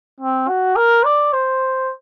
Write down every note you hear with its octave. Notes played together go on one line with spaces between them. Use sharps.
C4
F#4
A#4
D5
C5